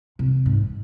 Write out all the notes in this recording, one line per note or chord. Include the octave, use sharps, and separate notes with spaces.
C3
G#2